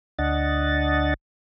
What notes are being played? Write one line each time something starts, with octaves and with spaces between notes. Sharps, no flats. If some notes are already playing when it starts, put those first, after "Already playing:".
D2 D4 D#5 F#5 A6